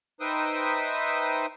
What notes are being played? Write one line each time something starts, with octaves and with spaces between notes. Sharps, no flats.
D#4 B4 C5 E5 G5 D#6